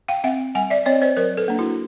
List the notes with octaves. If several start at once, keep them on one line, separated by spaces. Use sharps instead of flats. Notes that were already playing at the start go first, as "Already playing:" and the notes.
F5 G5
C4 E5 F#5
G3 F#5 G#5
D5 E5
C4 C#5 D#5
C5 D5
F#3 A#4 C5
A4 B4
A#3 D4
E4 F#4